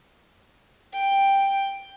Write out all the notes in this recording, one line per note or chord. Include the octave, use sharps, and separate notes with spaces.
G5